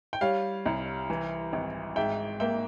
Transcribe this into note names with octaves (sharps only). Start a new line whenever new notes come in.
G5
G3 C#5 F5
C2
E3
G#1
G#2 E5 G5
A#3 E5 G5